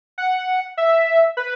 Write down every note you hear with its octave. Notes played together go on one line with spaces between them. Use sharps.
F#5
E5
B4